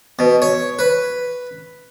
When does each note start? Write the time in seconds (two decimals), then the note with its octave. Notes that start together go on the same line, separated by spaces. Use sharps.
0.19 B2
0.42 C#5
0.79 B4